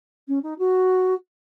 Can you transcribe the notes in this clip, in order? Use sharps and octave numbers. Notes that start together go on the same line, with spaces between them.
C#4
D#4
F#4